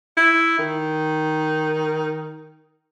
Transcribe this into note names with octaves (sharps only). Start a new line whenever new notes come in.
E4
D#3